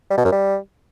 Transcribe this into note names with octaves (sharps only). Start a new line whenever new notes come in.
G3
B2
F#2
G3